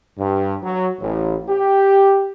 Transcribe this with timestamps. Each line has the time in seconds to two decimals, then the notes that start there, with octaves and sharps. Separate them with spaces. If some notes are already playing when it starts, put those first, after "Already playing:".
0.18 G2
0.62 F#3
1.00 A1
1.49 G4